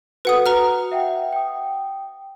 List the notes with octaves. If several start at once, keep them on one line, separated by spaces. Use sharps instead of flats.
F#4 A4 B4 F#5 D#6
F#4 B4 A#5 F6
E5 F#5 G5
G5 D#6